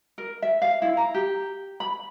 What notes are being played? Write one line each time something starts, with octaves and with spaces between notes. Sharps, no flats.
A#4
E5
F5
E4
A#5
G4
B5